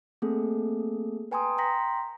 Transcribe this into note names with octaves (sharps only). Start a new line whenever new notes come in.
A3 A#3 C4 G#4 A4
B4 G5 G#5 A#5 C6 D#6
G5 A#5 C6 A#6 B6